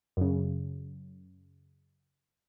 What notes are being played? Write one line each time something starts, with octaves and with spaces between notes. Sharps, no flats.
F#2 C#3